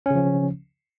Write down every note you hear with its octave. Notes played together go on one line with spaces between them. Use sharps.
C#3 F3 C#4